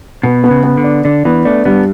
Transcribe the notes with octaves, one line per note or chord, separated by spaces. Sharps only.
B2 B3
B3
C#3
B3
D3
D4
D3 D4
E3 B3
A3 D4
G2 B3